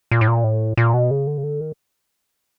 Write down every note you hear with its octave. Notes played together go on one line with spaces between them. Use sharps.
A#2
A2
A#2
A2
A#2
B2
C#3
D3
C#3
D3
D#3